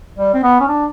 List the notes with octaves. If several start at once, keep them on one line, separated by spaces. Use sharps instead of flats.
G3
C4
B3
C#4
D4